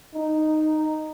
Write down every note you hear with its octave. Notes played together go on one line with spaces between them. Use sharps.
D#4